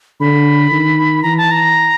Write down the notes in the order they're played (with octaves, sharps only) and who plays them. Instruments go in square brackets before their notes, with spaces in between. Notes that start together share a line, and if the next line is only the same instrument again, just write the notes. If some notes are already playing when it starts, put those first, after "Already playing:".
[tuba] D3 [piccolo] B5
[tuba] D#3
[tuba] E3 [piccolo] A#5
[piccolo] A5
A#5